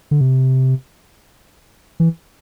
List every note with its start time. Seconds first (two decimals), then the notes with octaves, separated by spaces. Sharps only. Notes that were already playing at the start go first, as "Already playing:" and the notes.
0.11 D3
0.21 C3
2.00 E3